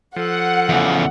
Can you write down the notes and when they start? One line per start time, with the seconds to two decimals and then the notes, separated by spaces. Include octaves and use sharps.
0.16 F3 A4 F#5
0.69 E2 C#3